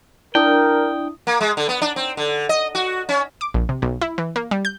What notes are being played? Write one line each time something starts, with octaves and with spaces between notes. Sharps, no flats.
D4 E4 A#4 G5 D#6
A#3
G#3
D3
B3
D4
C4
D3
D#5
F#4
C#4
D6
A#1
C3
B1
E4
E3
A#3
G3
G6